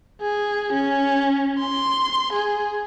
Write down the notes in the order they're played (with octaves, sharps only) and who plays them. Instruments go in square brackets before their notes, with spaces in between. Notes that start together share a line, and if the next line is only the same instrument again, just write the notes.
[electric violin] G#4
C#4
C6
G#4